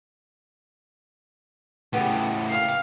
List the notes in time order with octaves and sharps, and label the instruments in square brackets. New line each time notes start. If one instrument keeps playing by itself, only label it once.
[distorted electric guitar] A2 C#3 [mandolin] B3 G4
[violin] F5 C7